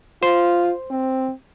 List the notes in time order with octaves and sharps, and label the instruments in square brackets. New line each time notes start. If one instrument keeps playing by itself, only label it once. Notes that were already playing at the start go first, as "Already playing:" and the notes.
[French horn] F4 [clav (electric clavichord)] C5
[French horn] C4